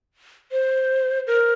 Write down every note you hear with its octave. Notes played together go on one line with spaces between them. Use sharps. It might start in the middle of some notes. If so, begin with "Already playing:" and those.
C5
A#4